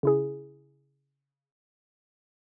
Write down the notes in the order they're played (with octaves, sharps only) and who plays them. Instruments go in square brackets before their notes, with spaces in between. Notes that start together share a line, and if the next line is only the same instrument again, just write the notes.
[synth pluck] C#3 E4 G#4